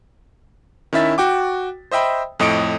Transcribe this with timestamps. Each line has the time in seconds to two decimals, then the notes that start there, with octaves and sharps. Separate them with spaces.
0.93 D#3 C#4 E4 E5 A6 B6
1.18 F#4 G5 D6
1.91 C5 D#5 E5 G5 B5
2.40 F2 A2 D#5 C#7 D7